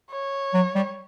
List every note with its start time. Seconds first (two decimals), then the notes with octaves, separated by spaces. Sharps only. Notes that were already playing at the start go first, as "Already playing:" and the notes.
0.12 C#5
0.54 F#3
0.75 G3